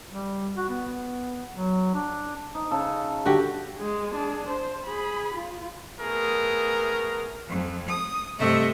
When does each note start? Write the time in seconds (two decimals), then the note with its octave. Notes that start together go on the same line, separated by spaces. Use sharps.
0.10 G3
0.57 F#4
0.70 B3
1.53 F#3
1.94 D4
2.55 D#4
2.71 C#3 A4
3.26 D3 F#4 G4
3.77 G#3 G#4
4.16 D4 G#4
4.49 C5
4.86 G#4 B5
5.35 F4
5.99 A3 B3 G#4 A#4
7.48 F2
7.89 D#6
8.39 G2 C3 A3 D#5 E5